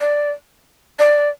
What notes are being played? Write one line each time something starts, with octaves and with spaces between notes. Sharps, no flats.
D5
D5